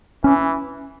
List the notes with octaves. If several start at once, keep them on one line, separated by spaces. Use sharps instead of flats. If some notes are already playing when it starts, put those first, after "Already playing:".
E3 C#4